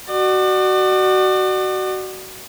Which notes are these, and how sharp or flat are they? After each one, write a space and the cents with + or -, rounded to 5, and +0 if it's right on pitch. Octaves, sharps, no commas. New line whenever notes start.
F#4 +20 D5 +40